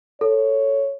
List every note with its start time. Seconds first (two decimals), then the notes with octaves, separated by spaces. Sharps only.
0.21 A4 C#5